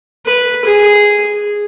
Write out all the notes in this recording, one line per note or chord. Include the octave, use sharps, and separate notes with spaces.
B4
G#4